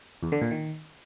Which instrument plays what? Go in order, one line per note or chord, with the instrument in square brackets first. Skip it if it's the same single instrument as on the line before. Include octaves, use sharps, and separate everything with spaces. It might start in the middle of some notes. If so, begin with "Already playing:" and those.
[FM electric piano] E2
D3
A#2
D#3